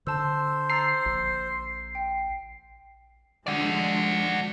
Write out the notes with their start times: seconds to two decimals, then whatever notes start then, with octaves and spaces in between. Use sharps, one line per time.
0.07 D3 C5 A5 E6
0.70 A#5 E6 A6 C7
1.06 A#1
1.95 G5
3.47 F3 G#3 D4 F#4 D5